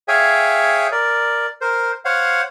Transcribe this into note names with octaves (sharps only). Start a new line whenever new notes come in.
G#4 C#5 E5 F5 G5 G#5
A#4 D5
A#4 C5
C5 C#5 F5 F#5